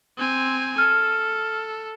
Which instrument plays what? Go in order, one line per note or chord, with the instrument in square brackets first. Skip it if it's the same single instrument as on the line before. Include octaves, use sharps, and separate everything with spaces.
[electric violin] C4 G#5
[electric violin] A4 [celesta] F6